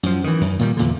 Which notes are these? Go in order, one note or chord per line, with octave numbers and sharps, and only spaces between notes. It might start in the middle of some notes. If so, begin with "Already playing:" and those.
F#2 F3
D#3 E3
F#2
A#2 D#3 G3
E2 A#2 D3